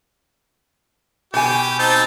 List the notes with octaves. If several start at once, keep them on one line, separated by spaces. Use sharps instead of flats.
B2 G4 G#5
C4 D#4 A5